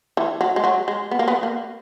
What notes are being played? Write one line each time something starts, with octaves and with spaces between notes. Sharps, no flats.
E3
F#3
G#3
F#3
G#3
B3
A#3
B3
A#3